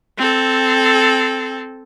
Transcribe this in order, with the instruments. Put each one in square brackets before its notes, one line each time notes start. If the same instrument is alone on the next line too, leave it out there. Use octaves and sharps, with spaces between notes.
[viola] C4 A4